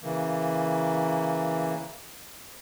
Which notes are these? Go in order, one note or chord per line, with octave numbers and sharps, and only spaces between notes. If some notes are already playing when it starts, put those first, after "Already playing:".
C#3 E3 A#3